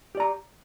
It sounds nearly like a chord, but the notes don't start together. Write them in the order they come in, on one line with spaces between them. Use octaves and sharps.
G4 D5 A#5